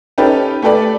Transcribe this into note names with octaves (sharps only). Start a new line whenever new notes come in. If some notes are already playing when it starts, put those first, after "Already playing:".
C#4 D#4 G4 A4 B4
A3 G4 A4 B4 D5